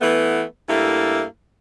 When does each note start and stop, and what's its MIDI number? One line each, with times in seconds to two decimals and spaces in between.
0.01 0.42 52
0.01 0.42 57
0.01 0.42 59
0.69 1.23 43
0.69 1.23 57
0.69 1.23 58
0.69 1.23 64